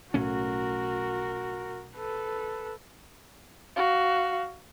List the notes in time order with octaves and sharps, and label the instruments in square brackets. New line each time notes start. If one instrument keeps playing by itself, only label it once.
[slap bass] B1 A2 C#4 [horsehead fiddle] F#4 A#4
[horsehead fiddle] A4 B4
[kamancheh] F#4 F5